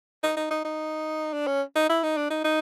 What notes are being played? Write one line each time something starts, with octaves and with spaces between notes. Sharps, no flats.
D#4
D#4
D#4
D#4
D4
C#4
D#4
E4
D#4
D4
D#4
D#4